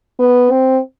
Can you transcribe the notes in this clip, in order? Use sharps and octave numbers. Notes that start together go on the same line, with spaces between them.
B3
C4